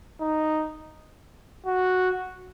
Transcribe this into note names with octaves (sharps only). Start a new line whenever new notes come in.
D#4
F#4